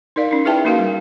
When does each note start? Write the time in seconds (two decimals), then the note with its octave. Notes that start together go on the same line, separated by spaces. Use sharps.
0.16 D#4 A#4 D5 F5
0.31 C#4 D#4
0.45 E4 G#4 B4 E5 G5 A5
0.65 A#3 C#4 D#4 F#4 A#4 F5
0.79 G3